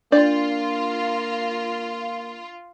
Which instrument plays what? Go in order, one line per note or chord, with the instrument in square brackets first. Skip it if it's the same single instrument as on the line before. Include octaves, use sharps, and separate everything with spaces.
[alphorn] A#3 [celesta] D4 [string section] F4 [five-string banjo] D5